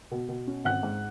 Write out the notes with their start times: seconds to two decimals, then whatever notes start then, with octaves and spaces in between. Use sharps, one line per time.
0.11 B2
0.29 B2
0.47 C#4
0.65 G#1 F#5 F#6
0.83 G#2